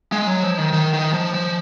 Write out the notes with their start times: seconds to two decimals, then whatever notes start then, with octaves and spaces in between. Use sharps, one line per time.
0.12 G#3
0.27 F#3
0.43 F3
0.58 D#3
0.73 D#3
0.94 D#3
1.13 F3
1.34 F3